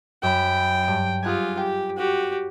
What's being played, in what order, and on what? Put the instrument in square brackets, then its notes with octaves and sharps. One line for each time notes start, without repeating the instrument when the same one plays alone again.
[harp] F#2 B5 [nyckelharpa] G5
[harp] G2 D7
[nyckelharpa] F4 G4 [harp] G#4 F#5 G#5
[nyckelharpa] G4 [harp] G5
[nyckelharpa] F#4 G4